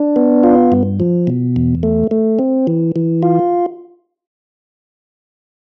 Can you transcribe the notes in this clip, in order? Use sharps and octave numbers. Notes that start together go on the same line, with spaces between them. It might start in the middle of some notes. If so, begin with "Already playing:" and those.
Already playing: D4
B3
F4
G2
F3
B2
E2
A3
A3
C4
E3
E3
F4